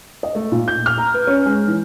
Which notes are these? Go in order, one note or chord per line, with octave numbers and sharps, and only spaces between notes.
D#5
A3
A#2
G6
F6
A#5
B4
C#4
G#3
E3